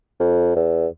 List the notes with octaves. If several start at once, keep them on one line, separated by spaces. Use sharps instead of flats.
F2
E2